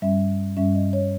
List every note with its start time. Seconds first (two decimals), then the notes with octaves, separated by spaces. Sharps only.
0.02 G2 G3 C#4 E5
0.57 G2 G3 C#4 E5
0.75 D#5
0.93 C#5